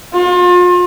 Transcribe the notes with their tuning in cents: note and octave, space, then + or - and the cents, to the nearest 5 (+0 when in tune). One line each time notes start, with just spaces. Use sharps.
F4 +35